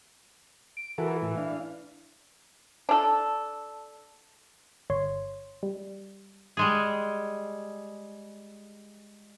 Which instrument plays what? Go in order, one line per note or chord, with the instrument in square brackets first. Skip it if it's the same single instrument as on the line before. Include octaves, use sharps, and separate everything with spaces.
[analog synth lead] D7
[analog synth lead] E3 [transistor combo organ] F#4 A4 A#4
[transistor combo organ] A2 E4
D4 F5
[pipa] D4 A4
[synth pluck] G1 C#5 C6
G3
[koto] G3 G#3 G#4